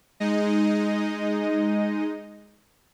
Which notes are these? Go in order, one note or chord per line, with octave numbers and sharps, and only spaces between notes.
G#3 D#4 D#5